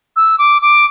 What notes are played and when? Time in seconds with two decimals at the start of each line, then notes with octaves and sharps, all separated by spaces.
0.16 E6
0.38 D6
0.62 D6